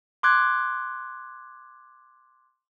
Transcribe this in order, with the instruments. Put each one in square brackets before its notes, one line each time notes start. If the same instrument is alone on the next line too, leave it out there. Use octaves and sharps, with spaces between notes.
[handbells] C6 D6 F#6 G#6